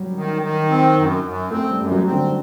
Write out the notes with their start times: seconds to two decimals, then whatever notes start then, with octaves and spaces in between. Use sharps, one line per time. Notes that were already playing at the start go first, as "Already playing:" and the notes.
Already playing: F#3 G3
0.15 D#3
0.42 D#3
0.70 C4
0.97 F#2
1.24 F#2
1.51 A3 C4
1.71 G3
1.78 F#2
1.92 F#3
2.06 C4
2.12 D3